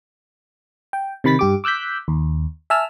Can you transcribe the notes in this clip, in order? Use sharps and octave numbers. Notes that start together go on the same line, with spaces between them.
G5
C3 D#3 B5 A6 B6
G2 G4 D6
D6 E6 F#6 G6 B6
D#2
E5 G#5 A5 E6 F6